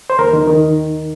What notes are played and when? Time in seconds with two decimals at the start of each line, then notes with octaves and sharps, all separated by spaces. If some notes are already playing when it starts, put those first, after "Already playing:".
0.10 C5
0.19 D#2 A#4
0.33 D#3
0.48 D#3